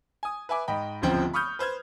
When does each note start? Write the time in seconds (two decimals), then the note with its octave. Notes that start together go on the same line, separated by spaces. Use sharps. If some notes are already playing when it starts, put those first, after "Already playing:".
0.23 G#5 D#6
0.49 B4 E5 G#5 D6
0.68 G#2 D#5 G5 B5
1.02 D1 G1 C#3 F3 C4 G5
1.33 B5 C#6 D#6 F6 G6
1.59 B4 C5 F6 G#6